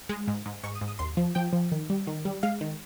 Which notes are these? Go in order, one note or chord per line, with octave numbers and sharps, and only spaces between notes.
G#3
G#2
G#2
G#2 C#6
D#6
G#2
D#6
D#2 C6
F3
F3 G5
F3
D#3
G3
D#3
G3
G#3 F5
D#3